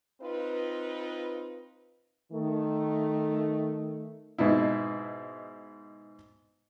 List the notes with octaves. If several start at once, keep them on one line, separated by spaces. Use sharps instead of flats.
C4 D#4 F4 B4
D#3 A3
G#2 B2 D#4 E4